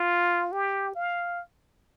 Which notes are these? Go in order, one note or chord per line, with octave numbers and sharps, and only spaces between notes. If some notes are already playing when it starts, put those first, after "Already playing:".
Already playing: F4
G4
F5